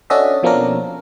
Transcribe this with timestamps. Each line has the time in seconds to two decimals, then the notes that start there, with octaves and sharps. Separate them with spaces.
0.10 C#4 D4 F#4 A4 D#5 E5
0.43 B2 F3 A#3 C#4 D4 A#4